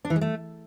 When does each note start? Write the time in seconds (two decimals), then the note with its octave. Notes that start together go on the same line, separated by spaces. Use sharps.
0.05 D4
0.10 E3
0.16 G#3
0.21 A3